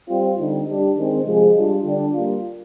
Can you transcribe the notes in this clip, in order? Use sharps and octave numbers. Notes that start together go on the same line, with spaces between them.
G3 C4 F4
D3 G3 C4 D#4
G3 D4 G4
D#3 G#3 C4
C3 F3 G#3
G3 D4 F4
D3 G3 D4
G3 A#3 F4